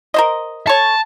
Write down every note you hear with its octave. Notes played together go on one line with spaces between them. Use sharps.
A#4 C5 D#5
A4 C#5 A5